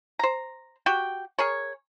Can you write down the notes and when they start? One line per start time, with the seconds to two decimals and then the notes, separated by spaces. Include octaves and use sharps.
0.19 C5 A#5
0.86 F#4 G4 G5
1.38 G#4 A#4 C#5